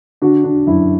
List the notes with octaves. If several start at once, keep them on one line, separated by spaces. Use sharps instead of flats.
D3 D4 F#4
D3 D4
F#2 E4